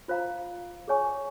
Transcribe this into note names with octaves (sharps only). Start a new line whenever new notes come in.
F4 C5 F5 A#5
G#4 C#5 G#5 C#6